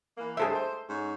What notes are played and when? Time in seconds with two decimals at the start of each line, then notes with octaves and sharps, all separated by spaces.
0.18 E3 A#3
0.37 G2 G#4 A4 C5 E5
0.53 C5
0.88 G#2 C#4